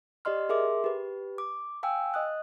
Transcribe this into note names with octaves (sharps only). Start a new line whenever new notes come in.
G4 D5 D#5 C6 F6
G#4 A#4 E5 C6 D6
G4 B4
D6
F5 G5 G#5 E6
D#5 D#6 F#6